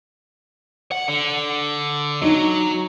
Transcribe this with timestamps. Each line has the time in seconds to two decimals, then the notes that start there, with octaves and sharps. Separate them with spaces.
0.92 F#5
1.08 D3
2.22 F#3 D#4